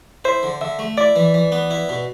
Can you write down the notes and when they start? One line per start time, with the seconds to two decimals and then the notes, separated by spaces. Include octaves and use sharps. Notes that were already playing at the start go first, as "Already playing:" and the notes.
0.25 E4 C5
0.43 D3
0.61 D3 E5
0.79 A3
0.97 E4 D5
1.16 E3
1.34 E3
1.52 B3
1.71 E4
1.89 B2